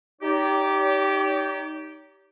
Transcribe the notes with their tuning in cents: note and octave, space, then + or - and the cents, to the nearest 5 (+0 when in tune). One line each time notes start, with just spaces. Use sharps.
D#4 +0 G4 -10 C#5 +45